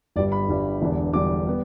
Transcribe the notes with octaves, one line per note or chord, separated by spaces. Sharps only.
G1 G2 G3 D5
B5
G1 G2 G3
E1 E2 D3 G3 D4
E1 E2 D3 G3 D4 D6
G3 B3